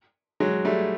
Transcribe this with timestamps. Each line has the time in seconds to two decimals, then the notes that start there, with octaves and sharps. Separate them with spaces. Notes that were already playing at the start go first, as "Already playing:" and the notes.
0.40 F#3 G#3
0.65 G3 A3